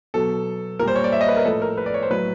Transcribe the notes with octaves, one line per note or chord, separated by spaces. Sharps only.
B2 F#3 A4
A#2 G3 A#4 C5
C#5
D5
E5
D#5
B4
A#4
A2 F3 A4
A#4
B4
D5
C#5
C5
A2 F#3 B4